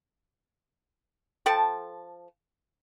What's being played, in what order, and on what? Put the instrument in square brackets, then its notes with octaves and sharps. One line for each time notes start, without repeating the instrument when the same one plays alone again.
[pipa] F3 A4 G5 A5